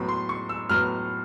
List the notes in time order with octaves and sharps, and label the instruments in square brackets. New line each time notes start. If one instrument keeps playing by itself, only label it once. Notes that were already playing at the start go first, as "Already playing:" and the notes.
Already playing: [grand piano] A2 F#3 B3 B5
C6
C#6
E6
A2 F#3 B3 F6